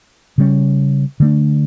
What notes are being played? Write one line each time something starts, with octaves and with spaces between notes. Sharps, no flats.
C#3 G3 C#4
D3 A3 D4